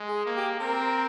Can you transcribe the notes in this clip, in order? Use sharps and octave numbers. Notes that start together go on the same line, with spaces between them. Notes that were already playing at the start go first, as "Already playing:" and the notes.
Already playing: G#3
G#4
A#3
G4
C4 A#4